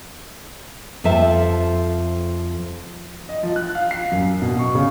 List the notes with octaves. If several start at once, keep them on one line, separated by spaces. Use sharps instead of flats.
F2 F3 A4 E5 A5
D#5
F3
F#6
F5
C7
F#2
B2
C#6
C#3